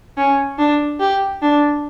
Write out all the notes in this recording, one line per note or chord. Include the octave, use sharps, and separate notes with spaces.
C#4
D4
G4
D4